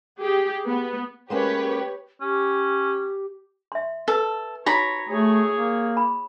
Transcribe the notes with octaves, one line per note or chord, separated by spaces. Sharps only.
G4 G#4
B3
G#3 A#3 C#4 G4 B4 C#5
C#4 G4
E5 C6
A4 B4
D#4 F#4 C#5 A#5 B5
A3 G#4 C#5
A#3
B5